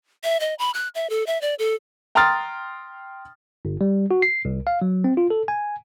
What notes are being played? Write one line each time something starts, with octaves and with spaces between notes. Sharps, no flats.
E5
D#5
B5
F#6
E5
A4
E5
D5
A4
G5 A#5 C6 D#6 F6 A6
G1
G3
F#4
C7
C2
F5
F#3
C4
F4
A4
G#5